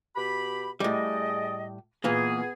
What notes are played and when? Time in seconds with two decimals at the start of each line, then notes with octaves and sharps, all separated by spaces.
0.16 B2 G4 B5
0.80 A2 G3 G#4 D5 D#5
2.04 A#2 E3 A#3 B3 G#4